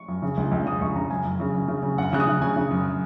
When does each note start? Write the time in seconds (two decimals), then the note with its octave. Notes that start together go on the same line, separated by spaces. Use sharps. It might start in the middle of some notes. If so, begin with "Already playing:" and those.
Already playing: C#6
0.08 F#2
0.22 C#3
0.37 C#2
0.51 C#2
0.66 C#3 D#6
0.81 C#2 C#6
0.95 C#3 A#5
1.10 F#2 G#5
1.25 F#2
1.40 C#3
1.54 F#2
1.68 C#3
1.83 C#3
1.98 F#2 F#5
2.13 C#3 F#6
2.20 D#6
2.28 C#3
2.42 C#3 G#5
2.56 C#3
2.71 F#2